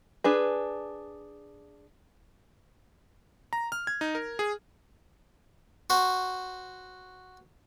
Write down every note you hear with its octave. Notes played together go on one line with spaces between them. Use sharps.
D4 G#4 B4
A#5
F6
G#6
D#4
A#4
G#4
F#4 C5